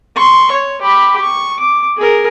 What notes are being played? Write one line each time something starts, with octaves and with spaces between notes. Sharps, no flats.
C6 C#6
C#5
G4 B5
C#6
D6
G#4 A#4